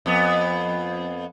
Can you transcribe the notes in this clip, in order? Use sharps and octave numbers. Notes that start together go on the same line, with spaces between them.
F2 B3